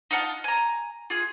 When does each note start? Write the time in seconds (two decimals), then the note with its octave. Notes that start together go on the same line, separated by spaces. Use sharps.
0.11 D#4 F4 F#5 A5
0.44 G#5 A#5
1.10 F4 G#4